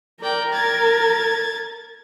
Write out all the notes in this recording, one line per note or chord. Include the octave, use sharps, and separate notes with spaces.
A#4 D5 G5
G#6 A6